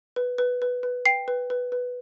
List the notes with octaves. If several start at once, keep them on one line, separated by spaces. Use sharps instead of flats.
B4
B4
B4
B4
G5 C7
B4
B4
B4